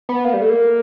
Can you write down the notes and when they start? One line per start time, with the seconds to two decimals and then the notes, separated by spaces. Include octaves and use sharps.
0.09 B3
0.25 A#3
0.34 G3
0.42 A3
0.50 A#3